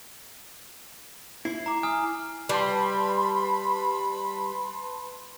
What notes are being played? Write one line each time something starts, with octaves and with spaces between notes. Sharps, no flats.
E4 C7
A#5 D6
G#5 D#6 F6
G3 B4 A5 B5 C6